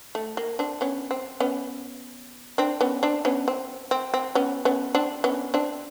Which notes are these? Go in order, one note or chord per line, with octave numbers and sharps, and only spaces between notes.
A3
A#3
C4 D4
B3 C#4
C4
B3 C#4
C4 D4
B3 C#4
C4 D4
B3 C#4
C4
C4
C4
B3 C#4
B3 C#4
C4 D4
B3 C#4
C4 D4